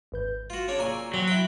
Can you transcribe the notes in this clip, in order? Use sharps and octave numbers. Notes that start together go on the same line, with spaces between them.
G#1 B4 G6
F4 F#4
C#3 D4 C#5
A#2 G#5 A#5 C#6 E6
F#3 C4 F#4
E4 G5